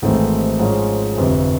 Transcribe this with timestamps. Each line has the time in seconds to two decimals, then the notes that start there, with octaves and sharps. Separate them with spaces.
0.02 G#1 G#2 E3 A3 C4
0.59 G#2 F3 G#3 C#4
1.17 G1 F2 C3